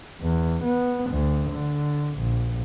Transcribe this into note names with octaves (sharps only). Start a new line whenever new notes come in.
E2
B3
D2
D3
A#1